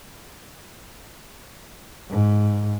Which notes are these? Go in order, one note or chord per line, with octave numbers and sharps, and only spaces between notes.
G#2